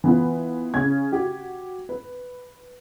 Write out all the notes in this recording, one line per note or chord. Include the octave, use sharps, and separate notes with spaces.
E3 B3 F4 B4
C#3 C#4 G#6
F#4 G4
B4